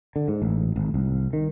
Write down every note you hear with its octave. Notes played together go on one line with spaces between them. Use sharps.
D3
G#2
A1
G#1
C2
D#3